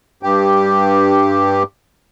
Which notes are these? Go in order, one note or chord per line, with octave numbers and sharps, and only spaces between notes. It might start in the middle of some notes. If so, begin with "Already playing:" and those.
G2 G4